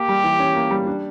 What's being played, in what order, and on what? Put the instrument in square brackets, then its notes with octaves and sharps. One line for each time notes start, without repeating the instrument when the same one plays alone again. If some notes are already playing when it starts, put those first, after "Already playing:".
Already playing: [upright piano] A#3 [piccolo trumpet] G4
[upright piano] G3
E3
C#4
A#3
G3
D4